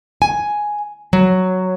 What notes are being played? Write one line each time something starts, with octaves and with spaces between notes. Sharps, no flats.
G#5
F#3